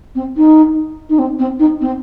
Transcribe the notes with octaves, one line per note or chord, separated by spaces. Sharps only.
C4
D#4
D#4
C4
C4
D#4
C4